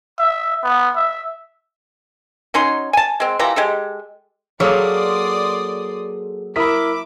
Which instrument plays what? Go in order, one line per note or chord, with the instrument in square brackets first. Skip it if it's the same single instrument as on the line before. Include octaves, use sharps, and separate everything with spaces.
[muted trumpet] E5
B3
E5
[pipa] F#3 C#4 D#4 C6
G#5 A5
G#3 C4
E3 F3 G4 A#5
G#3 G4 A4
[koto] F#3 A#3 [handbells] G#4 A4 [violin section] D5 C6 D#6
[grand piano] E4 A#4 D#6 [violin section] E5 D6 [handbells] B5 B6